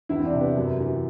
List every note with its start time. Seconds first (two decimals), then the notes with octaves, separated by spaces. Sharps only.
0.09 E2 E4
0.19 C4
0.25 D4
0.32 C3
0.40 B3
0.56 F#2
0.80 E3